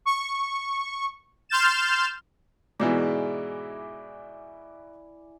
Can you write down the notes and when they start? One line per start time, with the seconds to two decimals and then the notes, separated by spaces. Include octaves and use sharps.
0.05 C#6
1.49 C6 F6 G6 A6 E7
2.80 G#2 B2 E3 E4 G#4 D5